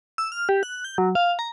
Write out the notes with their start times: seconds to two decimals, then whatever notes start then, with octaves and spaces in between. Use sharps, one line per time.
0.18 E6
0.32 F6
0.49 G4
0.63 F#6
0.84 G6
0.98 F#3
1.15 F5
1.39 A#5